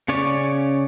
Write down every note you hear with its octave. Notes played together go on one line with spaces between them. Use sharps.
C#3 C#4 C#5 D5 C#6